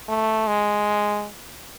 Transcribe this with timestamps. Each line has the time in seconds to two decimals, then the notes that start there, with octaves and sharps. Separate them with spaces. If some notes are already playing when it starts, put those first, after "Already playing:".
0.09 A3
0.48 G#3